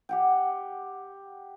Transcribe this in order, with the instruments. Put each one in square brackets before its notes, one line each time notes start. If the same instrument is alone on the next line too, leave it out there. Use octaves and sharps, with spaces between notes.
[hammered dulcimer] G4 F#5 G5